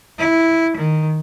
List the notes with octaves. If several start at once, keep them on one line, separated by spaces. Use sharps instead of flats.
E4
D#3